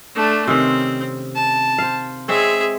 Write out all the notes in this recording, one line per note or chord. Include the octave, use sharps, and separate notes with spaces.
A3 D4
C3 D#3 C4 C#4
A5
C5 F5
G#3 C4 G#4 C#5 E5